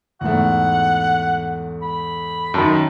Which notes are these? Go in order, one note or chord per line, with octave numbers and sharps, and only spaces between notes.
E2 G#2 A3 F#5
B5
F#2 D#3 A5